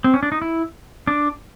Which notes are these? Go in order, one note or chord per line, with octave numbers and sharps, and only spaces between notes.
C4
C#4
D4
D#4
E4
D4